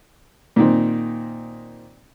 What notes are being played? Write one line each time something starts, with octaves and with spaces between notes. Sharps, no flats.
A#2 D#3 C4